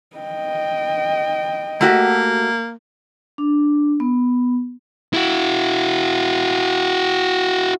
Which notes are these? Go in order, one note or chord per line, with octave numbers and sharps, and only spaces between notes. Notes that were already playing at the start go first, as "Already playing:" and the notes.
D#5 G5
A3 A#3 F#4 G4
D4
B3
E4 F#4